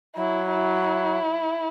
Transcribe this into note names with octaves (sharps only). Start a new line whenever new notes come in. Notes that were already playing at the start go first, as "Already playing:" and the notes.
F#3 E4
E4